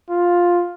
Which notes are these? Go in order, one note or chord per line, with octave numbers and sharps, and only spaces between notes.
F4